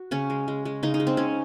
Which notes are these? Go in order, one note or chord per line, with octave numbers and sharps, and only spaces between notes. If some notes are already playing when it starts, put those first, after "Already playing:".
Already playing: F#4
C#3 C#4
G#3
G#3
G#3
C#3 D#4
D#4
G#3
C4
C#3 C#4